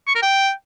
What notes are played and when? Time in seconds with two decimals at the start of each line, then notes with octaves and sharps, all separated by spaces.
0.08 C#6
0.15 A#4
0.22 G5